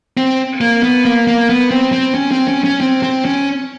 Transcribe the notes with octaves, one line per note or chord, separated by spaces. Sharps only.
C4
A#3
B3
A#3
A#3
B3
C4
C4
C#4
C4
C#4
C#4
C4
C4
C#4